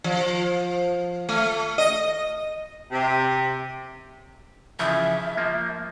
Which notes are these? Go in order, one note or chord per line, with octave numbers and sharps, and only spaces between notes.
F3
A3
D#5
C3
C#3 E3 F3 E5
F3 A#3